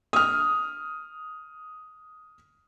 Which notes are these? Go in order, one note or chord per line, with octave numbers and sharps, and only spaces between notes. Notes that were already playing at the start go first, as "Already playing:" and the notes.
D#6 F6